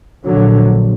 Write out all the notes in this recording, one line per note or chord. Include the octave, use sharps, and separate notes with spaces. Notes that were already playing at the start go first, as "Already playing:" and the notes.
A#1 A#2 D3 F#3